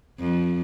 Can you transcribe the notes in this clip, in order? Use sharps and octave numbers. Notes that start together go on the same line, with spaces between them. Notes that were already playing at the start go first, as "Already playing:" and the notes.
F2